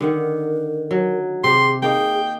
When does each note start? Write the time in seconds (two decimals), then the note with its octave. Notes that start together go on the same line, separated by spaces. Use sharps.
0.01 D3 D#3 A#4 F#5
0.91 F#3
1.44 C3 G4 G#4 C6
1.82 A#3 D#4 G#4 G5